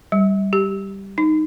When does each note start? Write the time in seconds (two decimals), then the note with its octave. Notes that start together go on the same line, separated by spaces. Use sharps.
0.12 G3
0.53 G4
1.18 D#4